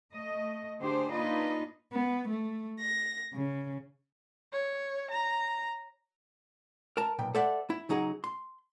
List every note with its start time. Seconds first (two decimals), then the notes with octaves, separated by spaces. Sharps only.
0.12 A3 D#5
0.82 D3 A3 D4 G4 G#4 C5
1.12 A#3 D4 D#4 F4 B4 D#5
1.92 B3
2.29 A3
2.80 A#6
3.34 C#3
4.53 C#5
5.11 A#5
6.97 A#4 A5 A#5
7.19 B1 A#2 G5
7.35 A4 C5 D5 E5 F#5
7.70 E4
7.89 C#3 F#3 D#4 G#4
8.24 C6